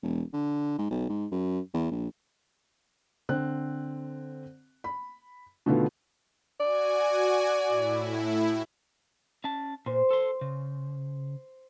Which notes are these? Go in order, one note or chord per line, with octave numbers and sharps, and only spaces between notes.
E1
D3
G#2
B1
G#2
F#2
E2
A#1
D3 C4 F#6
B5
B2 D3 D#3 A3 B3 F4
F#4 D5 G#5
A2 E4
C#4 A5
A#2 C5
A4 C6
C#3